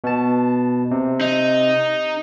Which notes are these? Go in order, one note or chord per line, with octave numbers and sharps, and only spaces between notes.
B2 A5
C3
D#4